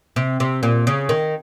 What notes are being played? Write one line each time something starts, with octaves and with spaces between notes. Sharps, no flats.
C3
C3
A#2
C#3
D#3